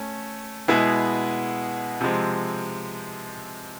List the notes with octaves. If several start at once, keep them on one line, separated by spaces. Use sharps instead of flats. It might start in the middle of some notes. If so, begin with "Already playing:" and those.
Already playing: A3 C#4
B2 G#3 B3 E4 G#4
C3 F3 G#3 C4